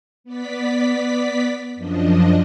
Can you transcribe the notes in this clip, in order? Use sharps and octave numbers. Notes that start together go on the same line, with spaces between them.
B3 D5 B6
F#2 F3 D4 D#5